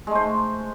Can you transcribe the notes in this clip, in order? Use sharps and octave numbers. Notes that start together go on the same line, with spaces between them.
G#3 A3 C5